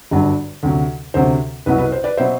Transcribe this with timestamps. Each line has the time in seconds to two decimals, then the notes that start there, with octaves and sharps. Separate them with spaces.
0.11 G1 G2 F#3
0.63 D2 C3 F#3
1.14 D2 C3 F#3 C5
1.66 C2 B2 F#3 B4
1.78 B4
1.92 C5
2.04 B4 D5
2.17 B2 F#3 C5 E5